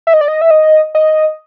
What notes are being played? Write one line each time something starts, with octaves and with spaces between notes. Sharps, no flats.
E5
D#5
D5
D#5
E5
D#5
D#5